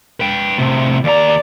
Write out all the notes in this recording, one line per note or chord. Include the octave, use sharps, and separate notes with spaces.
B4 G5
A2 C3
D#2 D5 A#5